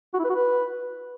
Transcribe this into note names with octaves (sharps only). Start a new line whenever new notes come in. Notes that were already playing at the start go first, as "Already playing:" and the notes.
F#4
E4
B4
F#4
B4